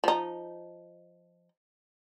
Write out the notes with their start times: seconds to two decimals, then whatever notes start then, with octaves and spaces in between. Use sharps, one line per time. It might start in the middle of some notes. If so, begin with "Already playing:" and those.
0.04 F3 D#4